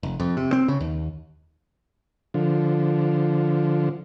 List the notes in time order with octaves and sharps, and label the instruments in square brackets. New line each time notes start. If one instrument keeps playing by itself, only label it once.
[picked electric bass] F1
F2
C3
C4
C#3
D#2
[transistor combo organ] D3 F3